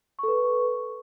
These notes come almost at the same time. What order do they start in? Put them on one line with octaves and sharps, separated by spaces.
C#6 A4 B4